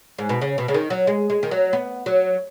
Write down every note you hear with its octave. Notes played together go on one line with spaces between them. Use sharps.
G#2
B2
C#3
B2
C#3
D#3
F#3
G#3
G#3
D#3
F#3
B3
F#3